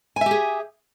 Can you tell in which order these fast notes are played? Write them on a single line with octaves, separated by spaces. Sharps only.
G#5 E5 G4 G#4